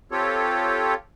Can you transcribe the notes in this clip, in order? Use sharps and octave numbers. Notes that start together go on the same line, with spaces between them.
C4 F4 G4 A4 C#5